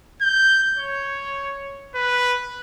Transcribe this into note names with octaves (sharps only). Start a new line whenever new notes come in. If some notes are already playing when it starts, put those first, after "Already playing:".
G6
C#5
B4